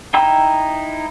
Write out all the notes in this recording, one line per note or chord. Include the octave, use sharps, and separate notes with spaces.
D#4 E4 G5 A#5 E6